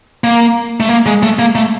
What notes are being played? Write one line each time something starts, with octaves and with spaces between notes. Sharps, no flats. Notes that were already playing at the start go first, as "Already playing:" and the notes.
A#3
A3
A#3
G#3
A3
A#3
A3